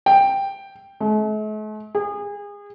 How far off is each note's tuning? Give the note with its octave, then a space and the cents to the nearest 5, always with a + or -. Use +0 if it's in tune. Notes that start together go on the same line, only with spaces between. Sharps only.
G5 +5
A3 -45
G#4 -30